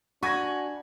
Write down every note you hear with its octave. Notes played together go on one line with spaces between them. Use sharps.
D4 F#4 G#5 B5 C#6 G#6 A#6